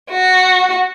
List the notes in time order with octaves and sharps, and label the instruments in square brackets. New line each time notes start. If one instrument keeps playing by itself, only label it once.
[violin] F#4